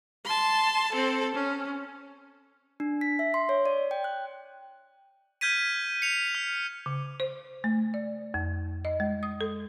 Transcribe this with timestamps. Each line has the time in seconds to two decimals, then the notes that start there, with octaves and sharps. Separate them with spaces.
0.25 A5 C6
0.92 C4 A4
1.35 C#4
2.80 D4
3.01 B6
3.19 E5
3.34 C6
3.49 C#5
3.66 D5
3.91 G5
4.04 F#6
5.41 F6 G6 G#6 B6 D#7
6.02 C#7 F7
6.35 F6
6.86 C#3
7.20 C5
7.64 A3
7.94 D5
8.34 F2
8.85 D#5
9.00 G#3
9.23 D#6
9.41 A4